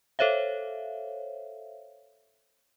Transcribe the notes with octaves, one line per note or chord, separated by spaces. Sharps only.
A4 C5 C#5 E5 F5